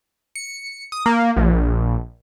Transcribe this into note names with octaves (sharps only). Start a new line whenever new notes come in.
C#7
D#6
A#3
A#1